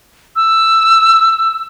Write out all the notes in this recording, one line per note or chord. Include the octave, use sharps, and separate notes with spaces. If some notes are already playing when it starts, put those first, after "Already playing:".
E6